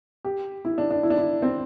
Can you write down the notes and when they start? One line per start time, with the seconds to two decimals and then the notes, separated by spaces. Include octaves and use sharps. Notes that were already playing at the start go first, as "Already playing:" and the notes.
0.25 G4
0.65 E4
0.78 D4
0.90 D4
1.03 E4
1.10 D4
1.18 E4
1.42 C4